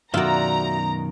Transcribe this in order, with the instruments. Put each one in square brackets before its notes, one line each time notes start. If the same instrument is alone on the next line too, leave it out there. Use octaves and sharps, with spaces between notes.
[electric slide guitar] F#2 B2 D#3 [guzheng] F4 D5 [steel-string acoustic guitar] F#4 E5 [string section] A#5